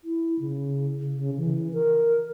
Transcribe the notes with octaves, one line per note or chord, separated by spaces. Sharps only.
E4
C#3
C#3
E3
A#4